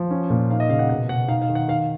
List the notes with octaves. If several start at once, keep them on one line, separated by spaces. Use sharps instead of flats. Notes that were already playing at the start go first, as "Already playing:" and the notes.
Already playing: F3
C#4
A#2
D#4 F5
D#5
C#3 F5
F#5
B2 F#5
B2 F#5
D#4 F5
F5
D#3
F#5
D#3 F5